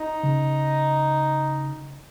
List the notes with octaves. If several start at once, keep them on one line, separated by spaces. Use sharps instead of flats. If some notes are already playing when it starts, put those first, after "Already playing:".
Already playing: D#4
C#3